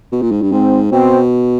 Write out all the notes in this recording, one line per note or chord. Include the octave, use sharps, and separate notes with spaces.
B2
A#2
G#2
G2
G#2 C4
B2 C4